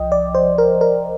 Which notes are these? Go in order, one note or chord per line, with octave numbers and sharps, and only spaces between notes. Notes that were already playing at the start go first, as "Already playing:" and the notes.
Already playing: C2 F3 D#5 G5
D5
C5
A#4
A#4